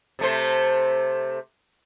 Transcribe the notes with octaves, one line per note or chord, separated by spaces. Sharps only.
C3 A3 C5